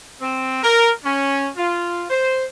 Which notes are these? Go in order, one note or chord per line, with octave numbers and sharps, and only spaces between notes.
C4
A#4
C#4
F4
C5